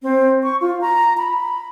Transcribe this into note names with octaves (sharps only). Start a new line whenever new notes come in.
C4
C#6
F4
A#5
B5